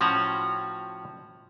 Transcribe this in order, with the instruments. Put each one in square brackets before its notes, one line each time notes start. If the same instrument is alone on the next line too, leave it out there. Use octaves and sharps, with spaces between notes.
[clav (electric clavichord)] A2 F3 C#4 F#4 F#5 A#5